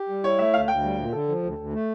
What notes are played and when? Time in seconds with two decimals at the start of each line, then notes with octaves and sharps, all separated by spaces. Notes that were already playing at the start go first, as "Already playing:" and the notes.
Already playing: G4
0.09 G3
0.24 E4 C#5
0.39 A3 E5
0.53 D2 F5
0.68 D2 G5
0.83 G3
0.98 A#2
1.13 D3 A4
1.28 F3
1.43 D2
1.58 D2
1.73 A3